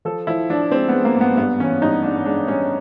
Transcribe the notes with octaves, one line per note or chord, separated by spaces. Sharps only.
F3 A4
F3 E4
F3 D4
G#3 C4
G#3 B3
A#3
G#2
B3
G2 B3
E3 C#4
G2 D#4
G2 D4
G#3 D4
G2 C#4